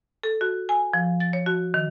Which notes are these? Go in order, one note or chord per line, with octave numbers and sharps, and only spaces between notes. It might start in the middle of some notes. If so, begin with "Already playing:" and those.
A4
F#4
G#5
F3
A6
C#5
F#4
D#3